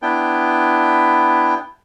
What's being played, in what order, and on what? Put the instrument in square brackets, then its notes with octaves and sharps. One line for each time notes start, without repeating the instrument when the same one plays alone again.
[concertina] B3 D4 E4 G5